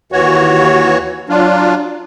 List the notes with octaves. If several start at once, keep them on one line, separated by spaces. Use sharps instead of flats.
D#2 E3 F#4 C#5
F#3 D4 F4